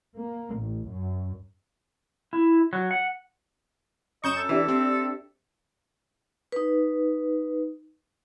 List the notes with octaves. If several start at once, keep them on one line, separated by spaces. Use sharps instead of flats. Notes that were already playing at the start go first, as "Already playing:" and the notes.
A#3
A1
F#2
E4
F#3
F#5
F#2 D#5 C#6 G6 E7
A4
E3 D4 G4 E5
C4
D#4 B4